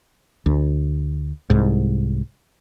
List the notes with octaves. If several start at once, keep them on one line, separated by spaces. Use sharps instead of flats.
D2
C2 G#2